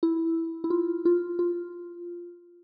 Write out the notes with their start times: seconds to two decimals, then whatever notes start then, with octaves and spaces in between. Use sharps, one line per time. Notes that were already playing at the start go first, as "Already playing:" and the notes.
0.03 E4
0.64 E4
0.70 F4
1.05 F4
1.39 F4